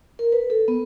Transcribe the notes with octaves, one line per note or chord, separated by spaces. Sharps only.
A#4
B4
A4
B3